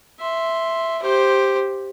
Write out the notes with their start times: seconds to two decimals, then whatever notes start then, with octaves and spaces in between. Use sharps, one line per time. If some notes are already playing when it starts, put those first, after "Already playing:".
0.20 E5 C6
1.02 G4 C5